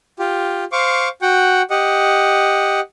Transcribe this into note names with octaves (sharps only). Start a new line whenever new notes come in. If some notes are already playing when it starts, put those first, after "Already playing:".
F4 G4
C5 F5 C#6 D6
F#4 F#5 G5
G4 D#5 F#5